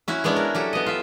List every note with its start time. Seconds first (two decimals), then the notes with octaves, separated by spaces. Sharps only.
0.08 C#4 E4 F#4
0.24 G#3 B3 C#4 D4 E4
0.36 A#4
0.55 F#3 G4 A4
0.73 B3 D#5
0.86 F4 E5